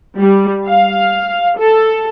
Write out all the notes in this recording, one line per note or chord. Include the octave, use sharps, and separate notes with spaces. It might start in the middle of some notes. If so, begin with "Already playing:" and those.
G3
F5
A4